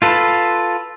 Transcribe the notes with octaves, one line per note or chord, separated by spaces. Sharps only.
F4 A4 B4